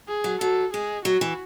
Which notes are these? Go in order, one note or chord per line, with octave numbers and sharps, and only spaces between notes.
G#4
F#3
F#3 A4
G#3 G#4
F#3 F#4
E3